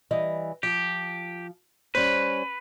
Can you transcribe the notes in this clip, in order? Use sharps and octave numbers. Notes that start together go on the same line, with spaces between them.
E3 G3 D#5
F3 G4
G3 C#4 B4 C5